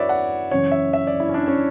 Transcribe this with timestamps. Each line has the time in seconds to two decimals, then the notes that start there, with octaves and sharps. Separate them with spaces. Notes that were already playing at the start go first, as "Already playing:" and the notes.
Already playing: F#2 F#3 E4 F#4 B4 C#5 D5 E5
0.09 F#5
0.51 F#2 C#3 E3 C#5
0.71 E5
0.93 E5
1.07 D5
1.20 E4
1.29 C#4
1.34 D4
1.48 C#4